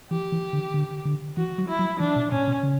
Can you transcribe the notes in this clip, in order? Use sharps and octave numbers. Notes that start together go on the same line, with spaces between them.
E3 G4
E3
D3
D3
D3
E3 F#4
F#3
E4
F#3
E3 D4
B2
A#2 C#4
B2
C#3